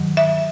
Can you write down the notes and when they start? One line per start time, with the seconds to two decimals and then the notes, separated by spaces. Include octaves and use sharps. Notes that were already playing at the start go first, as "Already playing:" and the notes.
Already playing: G2 D#3 F#3
0.17 E5